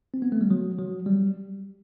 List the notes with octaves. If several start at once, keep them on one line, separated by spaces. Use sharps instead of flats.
C4
B3
A3
G3
F#3
F#3
G3